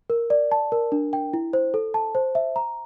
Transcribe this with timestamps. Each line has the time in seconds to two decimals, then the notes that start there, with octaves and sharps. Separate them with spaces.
0.10 A#4
0.30 D5
0.52 A5
0.72 A#4
0.92 D4
1.13 G5
1.33 E4
1.53 C5
1.74 A4
1.94 A5
2.15 C5
2.35 E5
2.56 A#5